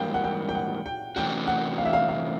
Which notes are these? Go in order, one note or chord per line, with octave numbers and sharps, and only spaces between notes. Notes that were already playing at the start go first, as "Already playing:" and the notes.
Already playing: G#2 E3 G3 A#3 F5 G5
F#5
G5
G5
F#5
G5
C3 E3 A3 C#4 F#4 G5
F#5
F5
E5
F5
F5